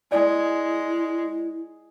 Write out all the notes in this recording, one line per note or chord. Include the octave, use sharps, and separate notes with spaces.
G#3 E4 D5